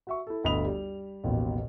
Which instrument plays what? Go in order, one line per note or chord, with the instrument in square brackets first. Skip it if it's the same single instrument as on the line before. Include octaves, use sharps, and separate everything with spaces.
[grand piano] F#4 E5 C#6
E4 A4
G1 D2 D#5 B5 D#6 F7
G3
A1 D#2 B2